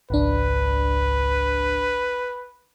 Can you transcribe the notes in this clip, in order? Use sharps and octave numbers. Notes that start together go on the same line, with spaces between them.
G#1 C#2 D4 B4